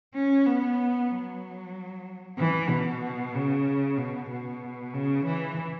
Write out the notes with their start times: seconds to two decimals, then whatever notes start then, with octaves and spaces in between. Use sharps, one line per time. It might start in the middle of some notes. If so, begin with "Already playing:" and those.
0.14 C#4
0.46 B3
1.10 F#3
2.38 E3
2.69 B2
3.34 C#3
3.98 B2
4.30 B2
4.93 C#3
5.26 E3